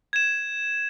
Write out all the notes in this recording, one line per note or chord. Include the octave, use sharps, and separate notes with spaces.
G#6 E7